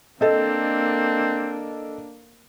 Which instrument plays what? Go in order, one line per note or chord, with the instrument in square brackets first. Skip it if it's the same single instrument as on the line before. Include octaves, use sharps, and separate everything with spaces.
[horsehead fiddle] A#3 D4 [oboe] C4 [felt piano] A4 D#5